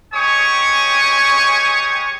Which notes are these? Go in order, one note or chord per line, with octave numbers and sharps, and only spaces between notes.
G#3 G4 C#5 G#5 C#6 D#6